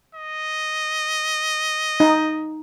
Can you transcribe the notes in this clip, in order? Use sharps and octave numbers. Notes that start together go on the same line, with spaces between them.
D#5
D#4